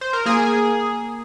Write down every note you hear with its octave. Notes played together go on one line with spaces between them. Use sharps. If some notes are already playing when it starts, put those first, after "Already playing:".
C5
A#4
A#3 G#4